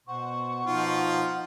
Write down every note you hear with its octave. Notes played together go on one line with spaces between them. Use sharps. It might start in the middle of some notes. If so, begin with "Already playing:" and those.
B2 C5 F#5 C#6
B2 F3 D#4 F4